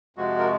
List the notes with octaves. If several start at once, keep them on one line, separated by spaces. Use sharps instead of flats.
F2 C3 F3 G#3 F#4
A#4